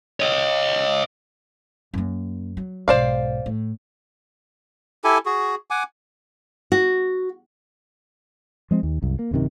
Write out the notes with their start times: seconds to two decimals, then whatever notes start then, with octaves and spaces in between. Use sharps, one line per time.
0.20 C#5 D#5
1.94 F#2 A#3
2.57 F#3
2.88 B1 G#2 C5 D5 F5
3.46 A2
5.04 E4 G4 A4 G#5
5.26 F#4 G#4
5.70 F#5 G#5 D6
6.72 F#4
8.71 F3 G#3 C4
8.83 D#2
9.02 C2 F#2
9.19 A#3
9.31 D1 F#2 C3 D#3